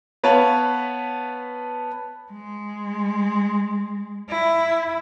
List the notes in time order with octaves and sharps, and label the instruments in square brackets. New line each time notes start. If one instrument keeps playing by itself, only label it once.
[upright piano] B3 B4 C#5 F5 A5 B5
[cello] G#3
E4